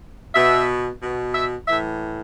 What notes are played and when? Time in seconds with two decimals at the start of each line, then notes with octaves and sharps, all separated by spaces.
0.34 B2 E5
1.02 B2
1.35 E5
1.68 A2 E3 E5